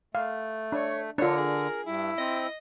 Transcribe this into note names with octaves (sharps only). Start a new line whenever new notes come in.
A3 F5
D4 C#5
D3 D4 F4 A#4 C#5
G#4
G2 E4
C4 D#5